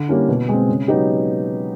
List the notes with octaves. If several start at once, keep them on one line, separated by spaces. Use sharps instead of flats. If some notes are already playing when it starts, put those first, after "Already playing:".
Already playing: D3
G3 A#3 C#4 E4
B2
G#3 C4
C#3
F#3 B3 D#4 G4